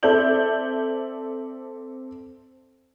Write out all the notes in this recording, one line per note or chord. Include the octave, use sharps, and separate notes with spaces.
C4 A4 D5 E5 G6 F#7